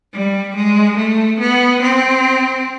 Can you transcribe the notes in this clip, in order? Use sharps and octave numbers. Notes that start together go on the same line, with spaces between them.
G3
G#3
A3
B3
C4